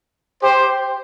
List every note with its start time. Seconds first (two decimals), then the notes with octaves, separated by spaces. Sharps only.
0.43 G4 C5